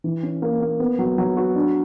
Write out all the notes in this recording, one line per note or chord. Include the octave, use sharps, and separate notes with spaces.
E3
C#4
A#3
A#3
B3
F#3
F#3
F#4
D4